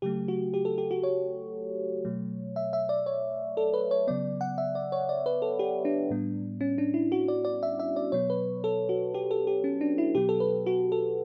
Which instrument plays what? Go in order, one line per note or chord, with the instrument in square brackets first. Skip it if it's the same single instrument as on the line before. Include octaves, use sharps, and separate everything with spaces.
[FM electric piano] C#3 F#3 A3 G4
F#4
G4
A4
G4
F#4
C#5
B2 F#3 A3
E5
E5
D5
C#5
A4
B4
C#5
C#3 F#3 B3 D5
F#5
E5
D5
C#5
D5
B4
A4
G4
D4
A2 G3 B3
C#4
D4
E4
F#4
D5
D5
E5
E5
D5
B2 F#3 B3 C#5
B4
A4
F#4
G4
A4
G4
C#4
D4
E4
B2 F#3 B3 G4
A4
B4
F#4
A4